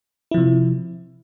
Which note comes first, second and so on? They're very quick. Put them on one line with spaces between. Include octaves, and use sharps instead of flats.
E4 F3 C3